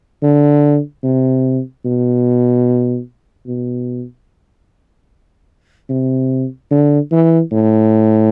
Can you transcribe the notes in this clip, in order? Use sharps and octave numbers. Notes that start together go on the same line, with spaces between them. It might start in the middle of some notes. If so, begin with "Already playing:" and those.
D3
C3
B2
B2
C3
D3
E3
A2